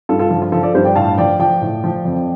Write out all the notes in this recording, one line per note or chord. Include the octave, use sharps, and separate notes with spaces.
G2 F4 A4
F4 A4
F3
F4
F3 F4 A4
A4 D5
G2 G4 C5
D5 G5
A2 F5 A5
F3 D5 G5
F3 D5 G5
A2
F3
F2